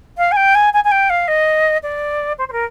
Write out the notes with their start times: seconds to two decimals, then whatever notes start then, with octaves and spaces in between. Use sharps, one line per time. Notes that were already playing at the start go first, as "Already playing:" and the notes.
0.18 F5
0.32 G#5
0.36 G5
0.55 G#5
0.73 G#5
0.84 G#5
0.91 G5
1.10 F5
1.28 D#5
1.83 D5
2.38 C5
2.48 C5
2.52 A#4